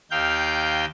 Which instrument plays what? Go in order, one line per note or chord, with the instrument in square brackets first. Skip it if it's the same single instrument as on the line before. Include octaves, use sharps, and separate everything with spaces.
[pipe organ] D#2 D#3 F5 G5 G6